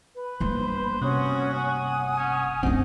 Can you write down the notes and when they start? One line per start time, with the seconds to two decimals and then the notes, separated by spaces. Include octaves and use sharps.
0.15 B4
0.40 G1 A#3 C5
1.02 C3 C#4 F#4 F#5 D#6
1.54 F#5 G#5 D#6
2.18 C#4
2.63 F#2 C4 D4 D#4